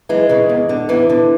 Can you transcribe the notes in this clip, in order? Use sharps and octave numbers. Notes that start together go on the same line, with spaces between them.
F#2 E3 G#3
C#3 E3
E2
D3
E2 E3
D3